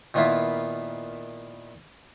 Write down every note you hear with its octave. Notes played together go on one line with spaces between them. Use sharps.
A#2 D#3 B3 E4 F4